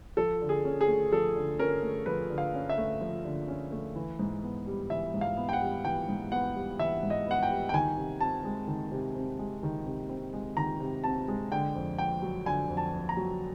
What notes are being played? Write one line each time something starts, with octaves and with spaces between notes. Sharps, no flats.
F3 A4
D3
G#4
C#4
G#4
A3
F3 A4
D3
C#4 A#4
A3
F3 B4
D3
F5
C#4
E5
A3
F3
D3
C#4
A3
E3
G#2
B3
G3
E3 E5
G#2
F5
B3
G5
F#5
G3
E3 G5
G#2
B3 F#5
G3
E3 E5
G#2
D#5
B3 F#5
G5
G3
G5
D#3 G#5
C3
C4 A5
G#3
D#3
C3
C4
G#3
D#3
C3
C4
G#3
D#3 A#5
C3
C4 A5
G#3
D3 G5
F2
F2 G5
F#3
D3 G#5
F2
A5
F2
A#5
F#3